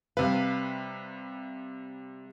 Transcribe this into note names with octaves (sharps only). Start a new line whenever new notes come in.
C3 G3 B4 F5